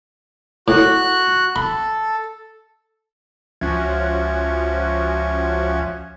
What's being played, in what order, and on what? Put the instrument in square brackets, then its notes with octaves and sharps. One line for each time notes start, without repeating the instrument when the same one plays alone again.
[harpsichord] A2 [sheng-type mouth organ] F#4 F#6
[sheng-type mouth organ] A4 [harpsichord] B5
[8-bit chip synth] C#2 E5 G#6 [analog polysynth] F3 C#4 F#4